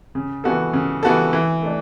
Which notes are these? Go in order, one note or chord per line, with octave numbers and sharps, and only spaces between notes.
C#3
E3 B3 F#4 A4
C#3
E3 B3 F#4 A4
E3
A3 D4